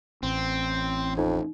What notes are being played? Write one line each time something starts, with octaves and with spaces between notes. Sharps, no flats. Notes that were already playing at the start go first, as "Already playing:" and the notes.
A1 C4
F2 D#4